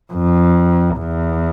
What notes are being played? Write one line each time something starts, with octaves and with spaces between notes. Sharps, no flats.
F2
E2